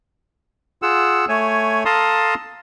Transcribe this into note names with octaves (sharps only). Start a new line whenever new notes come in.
F4 G#4 F#5 E6
A3 C#5 G#5
A4 F5 A5 A#5 C6 D#6